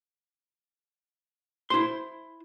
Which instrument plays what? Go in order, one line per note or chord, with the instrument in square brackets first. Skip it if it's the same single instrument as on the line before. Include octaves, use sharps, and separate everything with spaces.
[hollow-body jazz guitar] E4 C5 C6